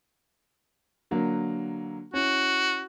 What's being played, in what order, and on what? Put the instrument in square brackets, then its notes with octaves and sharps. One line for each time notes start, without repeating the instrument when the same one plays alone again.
[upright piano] D3 F#3 A#3
[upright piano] C#4 E4 [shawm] F#4